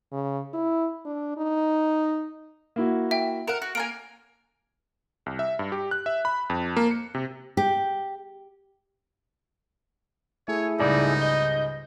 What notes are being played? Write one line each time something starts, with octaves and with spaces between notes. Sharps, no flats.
C#3
E4
D4
D#4
A#3 E4 F#4
E5 G5
A#4 F#5 E7
F#4
A#3 A#4 G#5 D7
C2
E5
G2
G4
F#6
E5
B5
F2
A#3
C#7
C3
G4
A3 E4 G#4 C#5
C#2 G#2 G3 D#4 D5
D#5 G6